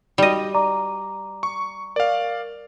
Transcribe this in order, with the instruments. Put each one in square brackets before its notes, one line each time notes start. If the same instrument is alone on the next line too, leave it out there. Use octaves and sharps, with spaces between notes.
[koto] G3 D#5 [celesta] D#4 F#4
[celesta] D5 A#5 D6
[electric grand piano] C#6
[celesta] A#4 [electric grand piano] D5 F5